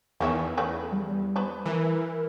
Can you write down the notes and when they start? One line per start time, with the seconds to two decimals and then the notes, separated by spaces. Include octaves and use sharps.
0.20 E2 D#3 C#4 E5
0.57 C#3 A3 B4
0.92 G3
1.36 B3 B4 C5
1.66 E3 A#4